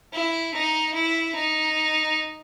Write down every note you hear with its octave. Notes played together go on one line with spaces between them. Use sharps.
E4
D#4
E4
D#4